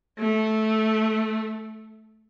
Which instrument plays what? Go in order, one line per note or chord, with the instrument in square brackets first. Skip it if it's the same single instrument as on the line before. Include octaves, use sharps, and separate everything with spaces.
[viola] A3